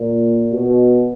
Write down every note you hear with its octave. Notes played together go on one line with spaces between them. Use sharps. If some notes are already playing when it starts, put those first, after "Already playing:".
Already playing: A#2
B2